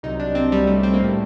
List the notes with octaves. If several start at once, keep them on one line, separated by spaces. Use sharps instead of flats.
C2 C3 F#3 D#4
D4
C4
C2 C3 F#3 G3
A3
C4
A#3
A2 G3 A3